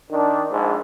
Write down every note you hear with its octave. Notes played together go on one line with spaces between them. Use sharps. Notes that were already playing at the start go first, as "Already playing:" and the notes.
D#3 D4
A#1 G#2